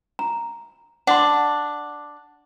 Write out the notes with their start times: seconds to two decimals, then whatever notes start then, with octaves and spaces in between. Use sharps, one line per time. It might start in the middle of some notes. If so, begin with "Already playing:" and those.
0.19 A#5
1.07 D4 F#5 C6